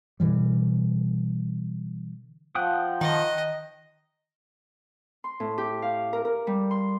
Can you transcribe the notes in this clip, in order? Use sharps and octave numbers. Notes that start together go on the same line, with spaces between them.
B2 D3 E3 G3
F3 F#5 G5 D#6
D#3 D#5
C6
A2
G4
F5
A#4
A#4
G3
C6